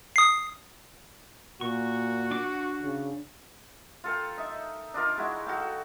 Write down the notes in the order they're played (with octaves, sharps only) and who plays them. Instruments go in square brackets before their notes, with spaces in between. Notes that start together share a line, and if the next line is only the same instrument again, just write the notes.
[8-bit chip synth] D#6 C7
[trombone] A#2 [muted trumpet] F#4 [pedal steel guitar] C#6
[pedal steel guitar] D4 D6
[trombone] C#3
[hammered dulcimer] F4 A4 A#4 G5
D#4 E5
D4 D#4 F4 A#4
G#3 D#4 E4 F#4
F#4 A4 F5 G5